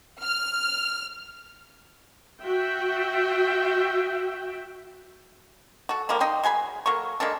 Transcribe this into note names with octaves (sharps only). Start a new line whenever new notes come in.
F6
F#4 E5 G5
F#4 A4
D3 F3 G3 A#3
D#4 D#5 G5 C6
F#3 G#4 G#5 B5
F#3 A#3 A4 C#6
G#3 A#3 D4 A4